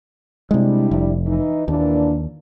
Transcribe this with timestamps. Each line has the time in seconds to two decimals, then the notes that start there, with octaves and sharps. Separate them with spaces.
0.51 C3 G3 G#3 D4 E4
0.91 F1
1.26 E3 D#4
1.68 D#2 A#2 E3 D4